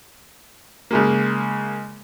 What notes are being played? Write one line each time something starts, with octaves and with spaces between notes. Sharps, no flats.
C#3 G#3 A#3